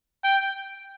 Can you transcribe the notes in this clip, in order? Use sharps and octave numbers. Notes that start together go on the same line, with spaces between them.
G5